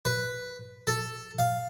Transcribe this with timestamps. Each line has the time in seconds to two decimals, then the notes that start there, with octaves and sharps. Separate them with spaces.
0.05 B4
0.87 A4
1.39 F5